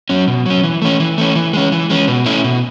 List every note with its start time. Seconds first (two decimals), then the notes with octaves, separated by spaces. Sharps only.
0.09 F#3 C#4
0.28 B2
0.46 F#3 C#4
0.64 E3
0.82 A3 C#4
1.00 E3
1.18 A3 C#4
1.36 E3
1.53 G#3 C#4
1.72 E3
1.90 G#3 C#4
2.08 B2
2.26 A3 C#4 E4
2.44 B2